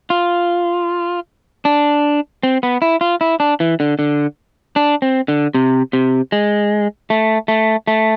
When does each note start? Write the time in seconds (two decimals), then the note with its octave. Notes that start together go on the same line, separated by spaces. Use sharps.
0.10 F4
1.65 D4
2.43 C4
2.63 B3
2.82 E4
3.01 F4
3.21 E4
3.40 D4
3.60 E3
3.80 D3
3.99 D3
4.76 D4
5.02 C4
5.28 D3
5.54 C3
5.93 C3
6.32 G#3
7.10 A3
7.48 A3
7.88 A3